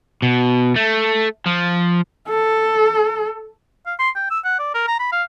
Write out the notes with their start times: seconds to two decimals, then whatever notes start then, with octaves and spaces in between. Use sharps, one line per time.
0.22 B2
0.76 A3
1.46 F3
2.29 A4
3.86 F5
3.99 C6
4.16 G5
4.31 E6
4.44 F#5
4.59 D5
4.74 A#4
4.87 A#5
4.99 B5
5.12 F5